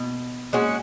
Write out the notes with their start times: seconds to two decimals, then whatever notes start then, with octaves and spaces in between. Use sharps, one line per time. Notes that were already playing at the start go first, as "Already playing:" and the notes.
Already playing: B2
0.53 A#2 G#3 C#4 F#4